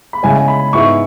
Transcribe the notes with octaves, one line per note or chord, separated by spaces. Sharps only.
B5
C#3 G#3 C#4 E4 G#5
G#5
B5
G#2 G#3 B3 E4 C#6